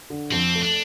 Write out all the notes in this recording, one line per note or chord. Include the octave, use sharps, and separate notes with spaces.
D3
F2 C4
A3
D4